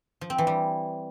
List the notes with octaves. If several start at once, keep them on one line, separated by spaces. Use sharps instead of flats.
F3
C4
E3
G3